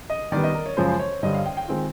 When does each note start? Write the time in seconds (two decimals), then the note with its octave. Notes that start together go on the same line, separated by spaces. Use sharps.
0.10 D#5
0.32 D#3 G3 B3 D5
0.44 D#5
0.55 A#4
0.66 C#5
0.77 F#2 C#3 F3 G#3 C5
0.89 C5
1.00 C#5
1.23 G2 D3 G3 D#5
1.34 F5
1.46 G5
1.57 G5
1.68 D#3 G#3 C4 F4